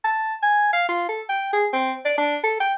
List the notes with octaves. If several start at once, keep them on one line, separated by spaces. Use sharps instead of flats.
A5
G#5
F5
F4
A4
G5
G#4
C4
D5
D4
A4
G5